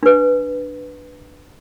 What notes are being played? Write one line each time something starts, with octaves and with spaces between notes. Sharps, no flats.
D4 B4